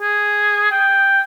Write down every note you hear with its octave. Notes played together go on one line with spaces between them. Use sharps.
G#4
G5